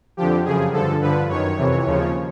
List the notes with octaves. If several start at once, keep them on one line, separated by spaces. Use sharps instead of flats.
F2 D3 F3 G4
F#2 C#3 F3 G#4
G2 D3 F3 A4
G2 D3 F3 B4
F#2 D#3 C#5
F2 C3 E3
D#2 C#3 F3